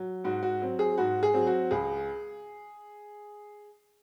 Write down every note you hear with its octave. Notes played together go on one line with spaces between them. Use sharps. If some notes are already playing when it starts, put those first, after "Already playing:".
Already playing: F#3
G#2 F#4
F#4
F#3 C4
G#4
G#2 F#4
G#4
F#3 C4
F#4
C#2 G#4